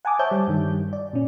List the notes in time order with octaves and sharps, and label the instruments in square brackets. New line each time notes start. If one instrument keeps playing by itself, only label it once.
[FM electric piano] F#5 G#5 A5 D6 D#6
C5 C#5 E5 A5 G6
G3
G2 D#3 G3
D5
A#2 C#4